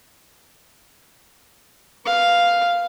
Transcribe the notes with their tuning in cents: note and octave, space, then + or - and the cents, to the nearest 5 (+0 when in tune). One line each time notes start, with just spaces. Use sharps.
B4 +0 F5 +0